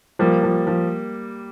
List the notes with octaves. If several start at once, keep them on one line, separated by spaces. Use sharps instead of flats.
F3 G3 A#3
F3
F3